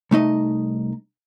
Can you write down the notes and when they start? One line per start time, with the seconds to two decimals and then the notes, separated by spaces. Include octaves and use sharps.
0.11 C2 A3 D#4 D#5